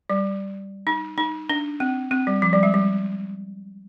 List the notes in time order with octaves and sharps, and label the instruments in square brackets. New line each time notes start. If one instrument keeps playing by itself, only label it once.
[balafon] G3
D#4
D#4
D4
C4
C4
G3
F3
G3
G#3
G3